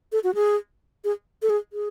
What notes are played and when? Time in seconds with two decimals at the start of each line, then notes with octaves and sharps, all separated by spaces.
0.12 A4
0.24 F#4
0.35 G#4
1.04 G#4
1.42 A4
1.50 G#4
1.73 G#4